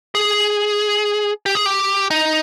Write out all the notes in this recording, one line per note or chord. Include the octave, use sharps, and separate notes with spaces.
G#4
G4
G#4
G4
D#4